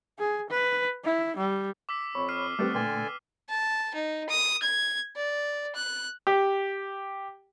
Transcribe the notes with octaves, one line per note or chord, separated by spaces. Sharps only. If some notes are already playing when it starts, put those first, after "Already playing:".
G#4
B4
E4
G3
D6 E6 B6
F2 C#5 B5 C#6
F6 C7 D#7
G3 A3 B3 C4 G4 D5 F#5
A#2 D3 A3 B4 D5 G5 G#5 C6
A5
D#4
D#6
G#6
D5
F#6
G4